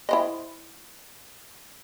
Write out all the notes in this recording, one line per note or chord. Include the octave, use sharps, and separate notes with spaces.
E4 C5 D#5